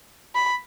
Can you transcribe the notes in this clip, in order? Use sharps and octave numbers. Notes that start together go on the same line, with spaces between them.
B5